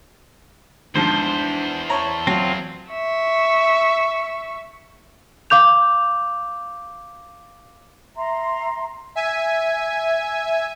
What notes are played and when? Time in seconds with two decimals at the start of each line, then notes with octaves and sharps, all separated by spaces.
0.95 E2 G#2 F3 D4 C5
1.90 C#5 A5 A#5
2.27 F#3 C4 F4
2.91 E5 C#6
5.50 F5 D6 G6 F7
8.16 E5 A#5 C6
9.15 E5 G#5